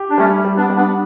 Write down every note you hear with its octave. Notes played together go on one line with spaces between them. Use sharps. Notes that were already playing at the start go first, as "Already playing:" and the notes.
Already playing: G4
D4
G3 A3 C#4
G3
B3 D4
G3
B3 D4